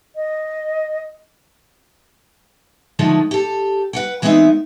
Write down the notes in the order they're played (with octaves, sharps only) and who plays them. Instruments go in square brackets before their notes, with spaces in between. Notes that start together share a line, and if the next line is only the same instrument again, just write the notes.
[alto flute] D#5
[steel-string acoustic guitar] D3 D#3 F3 G#3 A3 C#4
G4 A4
B4 F#5 G5
E3 G#3 B3 C4 D#4 E5